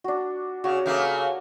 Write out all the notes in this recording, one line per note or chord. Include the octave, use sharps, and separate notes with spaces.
D4 F#4
C#3 F#4
C#3 A3 A#3 A#4